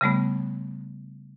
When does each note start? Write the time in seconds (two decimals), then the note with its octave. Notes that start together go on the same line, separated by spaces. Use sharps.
0.01 C#3 G3 A3 B3